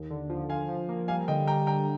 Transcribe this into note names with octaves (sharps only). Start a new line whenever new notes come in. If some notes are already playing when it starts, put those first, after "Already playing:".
Already playing: D#2
D3
F3
F3 F5 G#5
F3
A#3
G3 F5 G#5
D3 D#5 G5
G3 G5 A#5
D3 G5 A#5